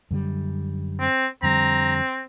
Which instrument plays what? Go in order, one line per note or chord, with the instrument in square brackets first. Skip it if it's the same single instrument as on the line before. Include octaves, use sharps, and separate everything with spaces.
[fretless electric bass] F#2 D3 G3
[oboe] C4
[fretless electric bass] F2 D3 G3 [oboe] C4 [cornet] A#5